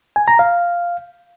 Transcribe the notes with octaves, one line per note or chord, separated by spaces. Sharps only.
G#5
A#5
F5